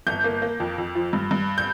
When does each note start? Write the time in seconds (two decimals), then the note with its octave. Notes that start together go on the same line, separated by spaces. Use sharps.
0.07 G1 G6
0.24 A#3
0.42 A#3
0.60 F2
0.78 F2
0.95 F3
1.13 G2
1.31 G2
1.58 G6